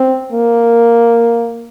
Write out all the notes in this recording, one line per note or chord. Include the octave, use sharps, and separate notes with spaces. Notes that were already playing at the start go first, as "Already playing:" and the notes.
Already playing: C4
A#3